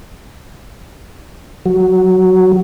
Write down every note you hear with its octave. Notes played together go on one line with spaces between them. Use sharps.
F#3